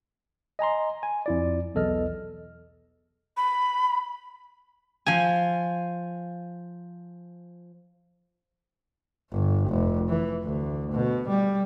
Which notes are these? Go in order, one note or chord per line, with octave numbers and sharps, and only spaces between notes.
D#5 G#5 A#5 C6
G#5
F2 E4 D5
B1 E2 A4 D#5 F6
B5
F3 G#5
G1
F1
E3
D2
B2
G3